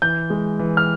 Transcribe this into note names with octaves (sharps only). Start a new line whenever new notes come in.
E3 G6
G#3
E3
F6